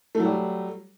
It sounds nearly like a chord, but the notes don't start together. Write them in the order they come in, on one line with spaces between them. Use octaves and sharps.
A3 F#3 G3